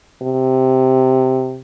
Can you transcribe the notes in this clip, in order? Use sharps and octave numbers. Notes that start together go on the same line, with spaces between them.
C3